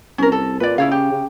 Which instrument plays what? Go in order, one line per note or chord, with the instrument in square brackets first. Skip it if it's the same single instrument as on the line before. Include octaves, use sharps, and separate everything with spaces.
[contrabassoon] C2 [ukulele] C#4 A#4
[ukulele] A4
[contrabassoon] A#2 [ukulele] B4 D5
[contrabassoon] C#3 [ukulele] E4 C#5 F5
[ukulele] G4
[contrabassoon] C#3